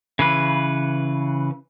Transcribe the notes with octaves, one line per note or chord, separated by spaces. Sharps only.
C#3 E3 B4